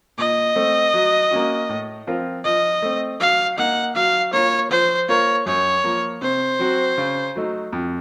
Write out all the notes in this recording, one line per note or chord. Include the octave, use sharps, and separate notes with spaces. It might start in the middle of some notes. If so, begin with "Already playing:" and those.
A#2 D#5
A3 C4
F#3
A#3 C#4 F#4
A2
F3 C4 F4 A#4
F3 D#5
A3 C4
F#3 F5
A#3 D#4 F#5
F#3 F5
A#3 F4 C#5
F3 C5
A#3 F4 A#4 C#5
F#2 C#5
F3 A#3
C3 C5
F#3 C4 F#4
C#3
F#3 A3 D#4
F2